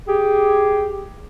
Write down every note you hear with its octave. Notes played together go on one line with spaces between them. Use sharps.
G4 G#4